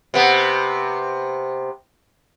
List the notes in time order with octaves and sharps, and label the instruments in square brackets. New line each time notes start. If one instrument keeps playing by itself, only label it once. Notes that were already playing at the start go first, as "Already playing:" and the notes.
[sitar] C3 B3